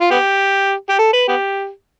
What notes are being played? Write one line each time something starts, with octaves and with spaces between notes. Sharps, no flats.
F4
B3 G4
G4
A4
B4
B3 G4